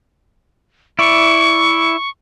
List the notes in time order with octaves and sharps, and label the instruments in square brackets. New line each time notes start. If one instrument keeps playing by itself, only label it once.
[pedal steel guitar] E4 D5 [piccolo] C#6